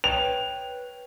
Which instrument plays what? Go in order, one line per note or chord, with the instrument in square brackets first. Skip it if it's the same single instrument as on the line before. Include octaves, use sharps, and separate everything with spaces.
[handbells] B4 C#5 G5 [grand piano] F7